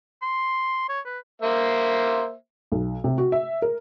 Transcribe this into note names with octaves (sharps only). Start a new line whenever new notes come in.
C6
C#5
B4
A#3 C5 E5
B1
C3
F#4
E5
A#4